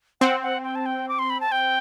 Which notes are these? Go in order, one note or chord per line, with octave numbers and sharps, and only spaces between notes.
C4 F#5
F#5
G5
A5
G5
D6
C6
B5
A5
G5